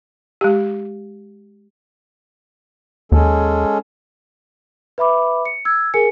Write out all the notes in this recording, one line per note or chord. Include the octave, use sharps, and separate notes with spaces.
G#3 G4
D#2 G#3 C#4 A4
B4 E5 B5 D6
C#7
E6 G#6
G#4 A#4 G#5 C#7